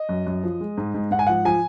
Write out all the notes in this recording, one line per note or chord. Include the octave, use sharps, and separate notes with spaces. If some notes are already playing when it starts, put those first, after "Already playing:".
Already playing: D#5
F#2
F#2
F3
G#3
G#2
G#2
G#2 F#5
G#5
F3 F#5
F3 G#5